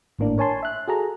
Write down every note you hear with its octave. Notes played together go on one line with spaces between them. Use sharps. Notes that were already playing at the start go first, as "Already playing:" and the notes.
G#1 A2 A#3 D4
A#4 C#5 G#5 A5 C6
E5 F#6
F#4 G#4 A4 A#5